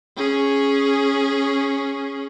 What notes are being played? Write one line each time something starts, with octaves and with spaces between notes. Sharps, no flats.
C#4 G#4